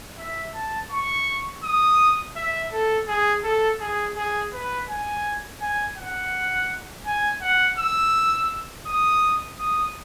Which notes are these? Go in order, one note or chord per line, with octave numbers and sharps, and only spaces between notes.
E5
A5
C#6
D#6
E5
A4
G#4
A4
G#4
G#4
B4
G#5
G#5
F#5
G#5
F#5
E6
D#6
D#6